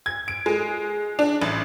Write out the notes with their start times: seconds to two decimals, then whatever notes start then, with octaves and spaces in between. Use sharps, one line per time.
0.06 G#6
0.28 D7
0.46 G#3
1.19 D4
1.42 A1